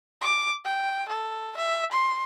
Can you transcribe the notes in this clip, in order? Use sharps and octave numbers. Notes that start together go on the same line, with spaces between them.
D6
G5
A4
E5
C6